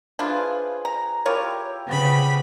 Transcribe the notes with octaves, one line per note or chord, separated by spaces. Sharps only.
F3 D4 E4 F4 G#4 B4
A#5
E4 F4 G4 A#4 C#5
C#3 F3 B3 B5